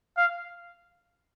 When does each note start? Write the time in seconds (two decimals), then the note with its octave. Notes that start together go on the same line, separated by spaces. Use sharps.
0.17 F5